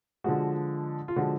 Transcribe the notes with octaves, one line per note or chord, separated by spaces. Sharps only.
D3 F3 G#3 F#4
F4
D3 F3 G#3 F#4